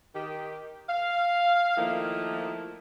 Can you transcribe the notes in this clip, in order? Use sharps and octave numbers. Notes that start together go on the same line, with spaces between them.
D#3 G4
F5
D#3 F3 A3 A#3 E4